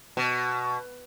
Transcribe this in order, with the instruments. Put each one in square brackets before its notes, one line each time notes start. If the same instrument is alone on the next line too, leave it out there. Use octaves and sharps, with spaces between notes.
[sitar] B2